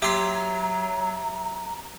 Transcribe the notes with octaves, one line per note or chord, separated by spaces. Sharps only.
F#3 G4 E5 A#5 C6